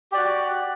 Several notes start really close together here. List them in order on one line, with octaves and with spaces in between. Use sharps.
G4 D5 F#4